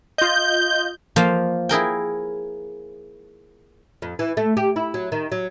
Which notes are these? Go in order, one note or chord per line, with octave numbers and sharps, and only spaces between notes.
F4 D#5 G6
F3 A#3 C5 F5
E4 G#4 A#4 G5
F2
E3
A3
G4
E4
F#3
D#3
F#3